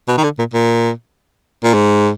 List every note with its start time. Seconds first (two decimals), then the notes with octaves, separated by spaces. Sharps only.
0.08 B2
0.18 D#3
0.24 D3
0.39 A#2
0.54 A#2
1.64 A#2
1.74 G#2